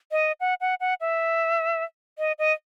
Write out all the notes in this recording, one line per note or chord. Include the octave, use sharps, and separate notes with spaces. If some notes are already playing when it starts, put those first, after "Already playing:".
D#5
F#5
F#5
F#5
E5
D#5
D#5